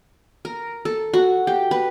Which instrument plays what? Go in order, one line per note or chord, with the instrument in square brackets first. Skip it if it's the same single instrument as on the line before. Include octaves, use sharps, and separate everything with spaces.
[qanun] A#4
A4
F#4
G4
B4